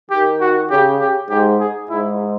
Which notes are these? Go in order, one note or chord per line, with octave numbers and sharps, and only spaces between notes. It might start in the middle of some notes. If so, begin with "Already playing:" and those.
D#3 G4
F#4
C#3 G4
G4
G#2 G4
G#4
G#2 E4